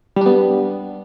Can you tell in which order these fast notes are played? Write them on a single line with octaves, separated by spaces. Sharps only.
G3 D4 B3